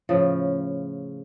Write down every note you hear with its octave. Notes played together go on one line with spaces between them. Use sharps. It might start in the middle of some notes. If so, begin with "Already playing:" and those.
A2 C#3 F3